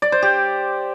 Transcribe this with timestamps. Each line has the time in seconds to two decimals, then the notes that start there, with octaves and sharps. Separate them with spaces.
0.02 D5
0.12 C5
0.23 G4